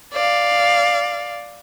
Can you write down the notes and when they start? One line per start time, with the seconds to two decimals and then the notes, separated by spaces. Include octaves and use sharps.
0.13 D5 F5